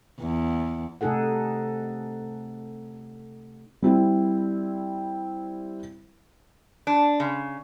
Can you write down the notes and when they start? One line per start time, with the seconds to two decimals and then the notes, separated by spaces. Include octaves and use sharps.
0.21 E2
1.01 C3 A3 D#4 G#4 A4 F#5
3.82 G3 C4 E4
6.87 D4
7.20 C#3